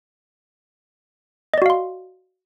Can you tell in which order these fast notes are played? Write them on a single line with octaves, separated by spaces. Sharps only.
D#5 D5 F#4 F5 C6